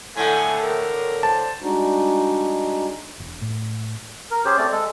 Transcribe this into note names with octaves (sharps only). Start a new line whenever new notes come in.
A2 D3 A3 G#5
A#4
C5 A5
G3 G#3 D4 D#4 F#4
E1
A2
A#4
C#4 G4 G#4 C5
A3 C4 D5
G#3 A4